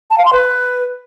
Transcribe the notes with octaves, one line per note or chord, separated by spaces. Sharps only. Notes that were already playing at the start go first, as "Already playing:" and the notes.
A5
F5
C6
B4